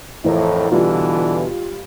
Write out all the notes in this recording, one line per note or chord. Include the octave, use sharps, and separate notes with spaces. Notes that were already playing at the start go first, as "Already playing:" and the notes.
F2 A2 E3 A#4
B2 D3 E3 G3 F4